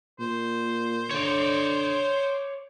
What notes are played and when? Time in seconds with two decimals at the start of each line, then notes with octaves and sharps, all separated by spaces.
0.20 A#2 C5
1.11 D3 C#5 D5